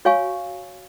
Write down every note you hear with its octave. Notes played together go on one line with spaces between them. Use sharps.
F#4 C#5 F5 G#5 C#6